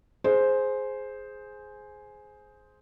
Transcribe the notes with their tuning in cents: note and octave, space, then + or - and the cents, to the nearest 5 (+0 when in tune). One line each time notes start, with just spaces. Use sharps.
G#4 +10 C5 +0